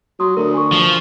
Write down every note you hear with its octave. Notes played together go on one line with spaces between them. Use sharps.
F#3 C6 D#6
D2 A#4
G#5 C#6
F3